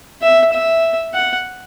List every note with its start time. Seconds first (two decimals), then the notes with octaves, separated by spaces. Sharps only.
0.22 E5
0.53 E5
1.14 F#5